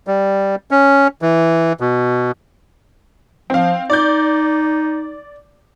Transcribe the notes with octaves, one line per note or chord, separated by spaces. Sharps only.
G3
C#4
E3
B2
F3 C4 F5
D#4 D5 G6